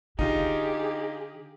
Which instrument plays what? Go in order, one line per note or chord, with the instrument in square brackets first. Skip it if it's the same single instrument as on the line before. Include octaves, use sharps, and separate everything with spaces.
[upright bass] D3 [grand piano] D#4 F4 [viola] G4 G#4